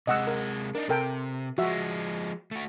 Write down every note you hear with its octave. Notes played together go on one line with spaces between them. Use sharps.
C3 G#3 D#5 F#5 E6
A#4
D4 D#4 A#4
C3 A4 A#4 G5
F3 G#3 F#4 E5
A3 F#4